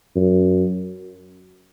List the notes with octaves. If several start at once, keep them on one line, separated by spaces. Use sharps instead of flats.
F#2